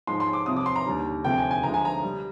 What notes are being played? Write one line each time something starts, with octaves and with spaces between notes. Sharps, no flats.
G#2 F3 G#3 C6
C6
D6
C2 C3 F3 D#6
D6
C6
A#5
D#2 D3 G3
D2 C3 F3 G#3 G5
G#5
G#5
D2 D3 F3 G#3 A#5
G#5
A#5
G3